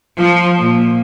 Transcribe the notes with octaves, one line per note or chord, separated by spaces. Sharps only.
F3
A#2